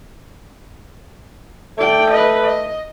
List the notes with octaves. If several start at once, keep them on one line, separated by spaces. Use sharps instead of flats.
A3 D5 G5
B4 D#5
D#5